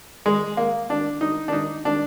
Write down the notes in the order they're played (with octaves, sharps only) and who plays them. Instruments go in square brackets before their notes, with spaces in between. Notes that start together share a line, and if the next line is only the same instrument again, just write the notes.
[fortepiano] G#3
A#3
D4
D#4
D4
D#4
D4